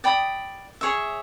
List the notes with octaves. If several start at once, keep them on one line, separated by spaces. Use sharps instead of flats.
D5 G5 B5 D#6
G#4 C#5 E5